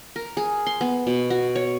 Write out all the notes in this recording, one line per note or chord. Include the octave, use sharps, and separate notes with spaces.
A#4
G#4
C6
B3
B2
F#4
C#5